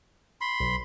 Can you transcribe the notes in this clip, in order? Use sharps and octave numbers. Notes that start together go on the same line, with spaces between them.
B5 C6
B1